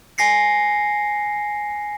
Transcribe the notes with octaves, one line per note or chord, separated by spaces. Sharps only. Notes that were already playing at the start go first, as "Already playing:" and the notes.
G#5 A#6 C7 C#7